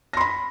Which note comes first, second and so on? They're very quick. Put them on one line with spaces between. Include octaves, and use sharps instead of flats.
A#6 C6 B5